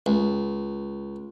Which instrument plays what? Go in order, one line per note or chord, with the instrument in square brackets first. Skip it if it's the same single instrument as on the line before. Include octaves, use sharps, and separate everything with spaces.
[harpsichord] C#2